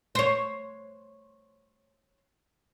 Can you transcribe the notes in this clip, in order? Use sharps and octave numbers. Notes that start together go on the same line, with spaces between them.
C5 C#5